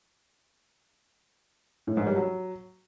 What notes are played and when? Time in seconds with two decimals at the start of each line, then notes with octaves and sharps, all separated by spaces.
1.87 A2
1.97 G#2
2.06 G3
2.16 F#3